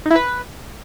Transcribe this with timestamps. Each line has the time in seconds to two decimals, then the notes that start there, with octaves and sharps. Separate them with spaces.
0.06 D#4
0.11 E4
0.16 B4